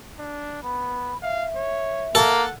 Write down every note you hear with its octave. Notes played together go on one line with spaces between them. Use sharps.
D4
B3 B5
E5 F5
C#5
A#3 A4 F#5